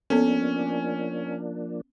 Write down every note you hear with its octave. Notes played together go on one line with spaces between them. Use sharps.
F3 A#3 B3 C#4 D4 A4 A#4